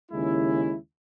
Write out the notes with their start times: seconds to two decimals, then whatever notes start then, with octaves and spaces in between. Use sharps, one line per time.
0.11 D#2 C#3 G#3 C#4 E4